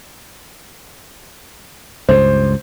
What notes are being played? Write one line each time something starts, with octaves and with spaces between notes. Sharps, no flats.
C#2 G2 C5